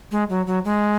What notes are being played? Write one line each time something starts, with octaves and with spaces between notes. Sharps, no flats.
G#3
F#3
F#3
G#3